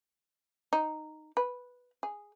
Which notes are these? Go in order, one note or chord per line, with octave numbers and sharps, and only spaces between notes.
D#4
B4
G#4